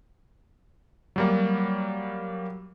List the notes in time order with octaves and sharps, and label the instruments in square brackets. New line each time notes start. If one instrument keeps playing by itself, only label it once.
[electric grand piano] F#3 G3 A#3